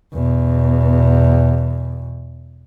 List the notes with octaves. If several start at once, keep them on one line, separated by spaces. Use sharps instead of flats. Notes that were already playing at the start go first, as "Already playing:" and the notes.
E2 B2